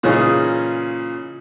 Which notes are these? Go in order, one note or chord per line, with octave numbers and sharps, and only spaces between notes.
A#2 C#3 E3 C#4 D#4 G#4